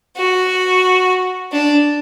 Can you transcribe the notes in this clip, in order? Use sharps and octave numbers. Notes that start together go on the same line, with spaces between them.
F#4
D4